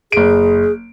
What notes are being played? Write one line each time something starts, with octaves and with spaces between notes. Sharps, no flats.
F#1 G#4 D7